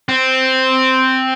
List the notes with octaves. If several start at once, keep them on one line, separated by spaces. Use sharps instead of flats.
C4